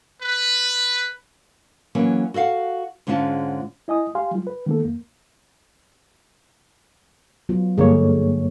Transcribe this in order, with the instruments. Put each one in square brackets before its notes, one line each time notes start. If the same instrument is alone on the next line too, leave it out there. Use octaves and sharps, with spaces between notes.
[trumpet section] B4
[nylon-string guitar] E3 F#3 A#3 C#4
F#4 A4 D#5 F5 F#5
G#2 D3 G#3 C#4 F4 A5
[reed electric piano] E4 D#5 G#5 D#6
G4 F5 G#5 C6
F#3 G3 F4
B4
D#3 G#3 A#3 B3 A4
F2 A#3
[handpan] F#3 B3 F4
[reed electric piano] G2 A#3 C#5 [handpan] D3 G#3 G#4